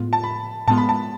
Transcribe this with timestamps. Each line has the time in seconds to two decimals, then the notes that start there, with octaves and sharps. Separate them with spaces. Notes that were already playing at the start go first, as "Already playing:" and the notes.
Already playing: A2 G#3 B3 F4
0.13 A5
0.24 B5
0.68 A2 G#3 B3 F4 A5
0.78 B5
0.89 A5